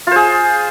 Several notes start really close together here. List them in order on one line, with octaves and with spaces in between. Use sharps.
F4 C5 G#4